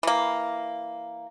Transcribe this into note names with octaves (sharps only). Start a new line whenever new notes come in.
E3 A#3